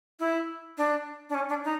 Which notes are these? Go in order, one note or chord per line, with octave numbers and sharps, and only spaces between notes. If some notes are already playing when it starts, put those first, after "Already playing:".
E4
D4
D4
C#4
D4
D#4